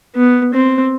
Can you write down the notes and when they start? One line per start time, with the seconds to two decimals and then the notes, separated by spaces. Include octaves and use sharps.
0.16 B3
0.54 C4